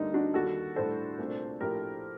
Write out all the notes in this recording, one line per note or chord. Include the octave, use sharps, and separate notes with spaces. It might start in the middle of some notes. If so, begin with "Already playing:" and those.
Already playing: D2 D3 G3 A#3 D#4
D4 F#4
D#2 D#3 G3 F#4 A4
A2 G3 D4 A4 C5
C2 A#2 A3 D4
A#1 A2 A3 G4 A#4